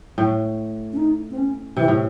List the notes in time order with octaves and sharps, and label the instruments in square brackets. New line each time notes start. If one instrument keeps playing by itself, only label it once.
[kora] A2
[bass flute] C#4
D#4
C4
C#4
[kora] C3 [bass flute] E3
[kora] A2